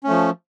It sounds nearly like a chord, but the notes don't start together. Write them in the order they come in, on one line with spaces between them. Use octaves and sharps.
C#4 A3 F3